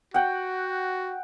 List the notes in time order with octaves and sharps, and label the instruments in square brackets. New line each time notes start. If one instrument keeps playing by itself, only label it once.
[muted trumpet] F#4 [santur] F#5 G5